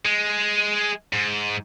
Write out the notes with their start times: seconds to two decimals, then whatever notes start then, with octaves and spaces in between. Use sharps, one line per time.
0.05 G#3
1.13 G#2